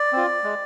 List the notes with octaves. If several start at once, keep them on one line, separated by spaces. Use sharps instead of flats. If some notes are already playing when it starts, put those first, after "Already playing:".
Already playing: D5
C4 F4
G#3